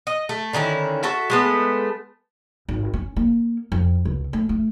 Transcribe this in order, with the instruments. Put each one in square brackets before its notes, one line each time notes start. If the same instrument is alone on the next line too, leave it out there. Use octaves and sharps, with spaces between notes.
[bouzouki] D#5
A3
D3 D#3 C#4 E4
F#4 A4 E5
G#3 A3 B3
[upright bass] G#1
C#4
A#3
F2
C#2
A3
A3